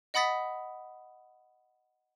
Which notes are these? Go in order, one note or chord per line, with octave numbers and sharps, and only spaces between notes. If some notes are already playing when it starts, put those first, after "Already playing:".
D#5 F#5 B5 D#6 A6 B6